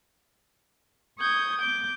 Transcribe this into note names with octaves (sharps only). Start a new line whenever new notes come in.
C#6 D#6 G6 G#6
D6 G6